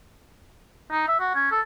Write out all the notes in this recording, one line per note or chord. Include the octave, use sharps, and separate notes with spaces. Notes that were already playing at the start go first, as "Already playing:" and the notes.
D#4
E5
F#4
C#4
A4